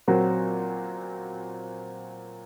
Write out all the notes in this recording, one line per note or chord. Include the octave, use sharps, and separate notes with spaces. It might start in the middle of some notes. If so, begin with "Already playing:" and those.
A#2 F#3 C4 F#4